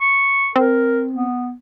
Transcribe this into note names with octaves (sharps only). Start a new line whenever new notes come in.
C#6
C4 A#4
B3